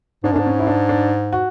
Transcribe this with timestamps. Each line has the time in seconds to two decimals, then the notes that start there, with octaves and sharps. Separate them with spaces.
0.24 G#2 D4
0.32 F#2
0.36 G#2 D4
0.46 C#4
0.59 E4
0.67 D4
0.89 D4
1.33 F#4